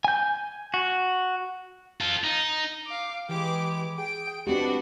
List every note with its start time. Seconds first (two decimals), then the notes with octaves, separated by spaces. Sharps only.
0.05 G#5 G6
0.74 F#4
2.01 F4 A4
2.24 D#4
2.87 F5 D6
3.29 E3 G#3 G4 B4 D6
3.98 G#4 G5 D7
4.47 G#3 C4 D4 F#4 G4 B4